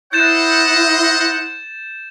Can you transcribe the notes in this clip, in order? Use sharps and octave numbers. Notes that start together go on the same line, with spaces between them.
E4 C5 D#5 F#5 G6 A6 E7